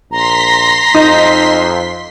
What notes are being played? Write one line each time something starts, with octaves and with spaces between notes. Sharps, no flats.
A#1 A#5 C6 B6
F2 D#4